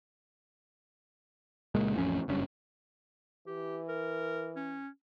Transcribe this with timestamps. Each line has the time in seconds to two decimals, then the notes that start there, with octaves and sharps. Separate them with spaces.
1.75 C#2 A#2 G#3 A#3
1.96 A1 F2 C#4
2.28 F#1 G2 C#4
3.47 E3 G4
3.88 A#4
4.56 C#4